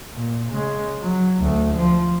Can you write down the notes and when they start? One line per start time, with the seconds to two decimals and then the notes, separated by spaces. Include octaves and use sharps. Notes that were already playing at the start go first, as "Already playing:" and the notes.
0.14 A#2
0.51 C#3 G#3
1.01 F#3
1.39 D2 A3
1.75 F3